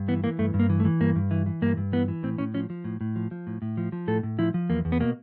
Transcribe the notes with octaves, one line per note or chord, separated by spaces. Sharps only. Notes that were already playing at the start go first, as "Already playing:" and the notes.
Already playing: G2
E3 B3
E3 A#3
G2 A3
G2
A#3
E3
A3
E3
G2 A#3
G2
E3
E3
G2 A#3
G2
E3 B3
E3
A2 C4
A2 C#4
F3 C#4
F3
A2
A2
F3
F3
A2
A2
F3
F3
A2 A4
A2
F3 E4
F3
E2 A#3
E2
B3
B2 A#3